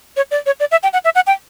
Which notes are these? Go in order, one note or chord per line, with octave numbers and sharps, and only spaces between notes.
C#5
D5
C#5
D5
E5
G5
F#5
E5
F#5
G5